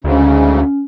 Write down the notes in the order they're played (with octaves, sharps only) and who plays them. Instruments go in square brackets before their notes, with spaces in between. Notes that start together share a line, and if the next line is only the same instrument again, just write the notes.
[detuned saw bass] D2 [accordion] G#2 C#3 [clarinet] C#4